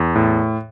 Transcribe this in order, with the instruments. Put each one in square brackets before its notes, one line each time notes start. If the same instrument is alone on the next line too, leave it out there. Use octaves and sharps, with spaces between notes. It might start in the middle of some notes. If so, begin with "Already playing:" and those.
Already playing: [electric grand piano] E2
A2